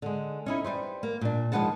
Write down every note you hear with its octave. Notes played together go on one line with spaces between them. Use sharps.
D3 G#3
C#4 D#4 E4
G3 B4 C5
A#3
A#2 D4
D#2 F3 G#3 B4 F#5 A5